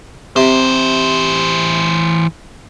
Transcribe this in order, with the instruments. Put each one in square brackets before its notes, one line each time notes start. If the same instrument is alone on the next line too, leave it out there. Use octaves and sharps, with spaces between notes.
[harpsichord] C3 [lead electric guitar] E3 C5